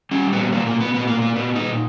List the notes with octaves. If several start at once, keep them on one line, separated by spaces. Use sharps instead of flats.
G3 C#4
A#2 B3
A#2 A#3
A#3
A#2
B3
A#2 B3
A#3
A#2
A#3
A#2 B3
A#2 D#4